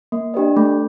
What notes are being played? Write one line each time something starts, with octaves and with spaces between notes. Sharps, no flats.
A#3
D4 G4 B4 D#5
A3